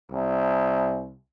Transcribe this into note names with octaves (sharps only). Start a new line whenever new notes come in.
C2